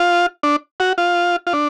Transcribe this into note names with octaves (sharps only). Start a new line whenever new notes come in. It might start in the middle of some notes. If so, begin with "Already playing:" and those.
Already playing: F4
D4
F#4
F4
F4
D4